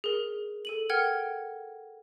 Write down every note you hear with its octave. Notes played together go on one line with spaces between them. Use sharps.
G#4 A#4
A4 D#7 F#7
A#4 F#5 G5 F6 G#6